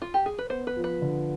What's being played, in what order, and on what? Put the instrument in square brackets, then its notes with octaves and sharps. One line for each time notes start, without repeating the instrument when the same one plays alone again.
[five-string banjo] F4
G4
G#4
B4
[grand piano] B3 [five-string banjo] C5
[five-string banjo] B4
[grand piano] F3
[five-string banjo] B4
[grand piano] D3